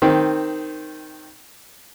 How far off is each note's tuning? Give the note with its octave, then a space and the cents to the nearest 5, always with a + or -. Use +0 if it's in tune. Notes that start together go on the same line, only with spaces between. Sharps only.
D#3 +0 C4 +0